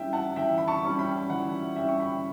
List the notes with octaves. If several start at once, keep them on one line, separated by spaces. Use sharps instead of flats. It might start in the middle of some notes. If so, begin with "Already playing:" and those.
Already playing: E3 G3 C#4 E4 E5 G5
F#5 A5
E3 E5 G5
B5
A5 C#6
G3 C#4 E4
G5 B5
E3 F#5
G3 C#4 E4 E5 G5
C#6
G5 B5